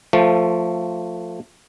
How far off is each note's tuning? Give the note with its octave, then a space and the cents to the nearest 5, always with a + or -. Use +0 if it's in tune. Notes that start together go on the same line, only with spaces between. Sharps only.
F3 +5 A3 +20